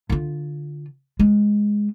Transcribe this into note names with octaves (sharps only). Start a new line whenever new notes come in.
D3 F4
G#3